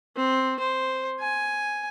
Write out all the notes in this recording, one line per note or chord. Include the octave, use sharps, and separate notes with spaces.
C4
C5
G#5